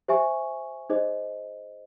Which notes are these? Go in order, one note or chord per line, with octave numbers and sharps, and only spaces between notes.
G4 C5 E5 G#5 C#6
D#4 G#4 C5 D#5